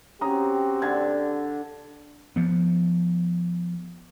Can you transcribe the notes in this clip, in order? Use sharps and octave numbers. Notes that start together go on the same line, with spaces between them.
C4 C#4 F#4 G4 A#5 D#6
D3 G#6
F3 B3